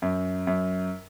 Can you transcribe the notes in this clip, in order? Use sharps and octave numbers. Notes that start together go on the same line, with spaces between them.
F#2
F#2